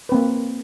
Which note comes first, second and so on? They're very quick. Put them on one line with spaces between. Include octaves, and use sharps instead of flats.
B4 C4 A#3